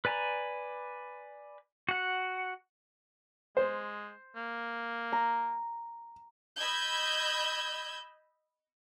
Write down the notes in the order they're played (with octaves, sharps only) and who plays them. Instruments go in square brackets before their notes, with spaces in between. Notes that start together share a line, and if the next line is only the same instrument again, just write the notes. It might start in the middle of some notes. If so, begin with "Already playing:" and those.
[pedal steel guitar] B4 D5 G#5 A#5 B5
F#4 F#5
[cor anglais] G#3 [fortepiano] C5
[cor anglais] A#3
[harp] A#5
[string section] D#5 B5 E6 G6 G#6